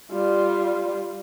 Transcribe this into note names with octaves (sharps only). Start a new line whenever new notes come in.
G3 F4